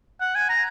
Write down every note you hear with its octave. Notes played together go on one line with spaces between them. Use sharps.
F#5
G#5
A#5